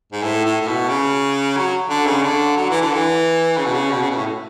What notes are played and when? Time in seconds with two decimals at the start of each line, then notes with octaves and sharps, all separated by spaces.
0.12 G#2
0.23 A2
0.45 A2
0.61 A2
0.67 B2
0.89 C#3
1.56 F#3
1.90 D3
2.07 C#3
2.23 D3
2.56 F#3
2.70 E3
2.81 D3
2.93 E3
3.58 C#3
3.65 B2
3.73 C#3
3.91 B2
4.02 C#3
4.10 B2
4.16 A2